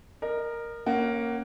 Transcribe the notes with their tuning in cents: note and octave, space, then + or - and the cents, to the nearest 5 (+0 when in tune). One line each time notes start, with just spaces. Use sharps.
A#4 +0 D#5 -40
A#3 +0 C#4 -10 F#5 +25